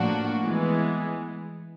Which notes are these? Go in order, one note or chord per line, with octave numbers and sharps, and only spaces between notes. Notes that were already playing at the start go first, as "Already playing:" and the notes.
Already playing: A2 F3 A#3 D4 F#4
E3 G#3 B3